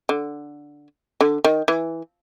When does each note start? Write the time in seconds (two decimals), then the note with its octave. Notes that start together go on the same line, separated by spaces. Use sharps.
0.09 D3
1.21 D3
1.44 D#3
1.68 E3